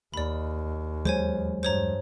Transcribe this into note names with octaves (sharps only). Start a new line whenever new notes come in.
D#2 D5 B5
E2 F#3 G#3 C5 C#5 G#5
G2 C5 C#5 A#5